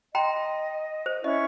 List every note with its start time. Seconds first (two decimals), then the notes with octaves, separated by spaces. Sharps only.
0.15 D#5 G5 A#5 C6
1.06 C5
1.24 C#4 E4 D#5 C#6